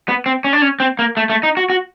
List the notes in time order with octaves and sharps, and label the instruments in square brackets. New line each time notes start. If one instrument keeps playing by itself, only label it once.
[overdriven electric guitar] B3
C4
C#4
D4
C#4
C4
A#3
A3
A3
D#4
F#4
F#4